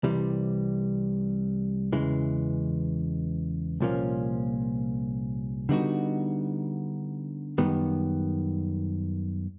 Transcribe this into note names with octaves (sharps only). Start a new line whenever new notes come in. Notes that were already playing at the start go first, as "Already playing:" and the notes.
C2 C3 E3 G3
E2 C#3 E3 G#3
C2 A#2 F3 A#3 C#4
D3 G3 B3 D#4 F#4
F#2 D#3 G3 B3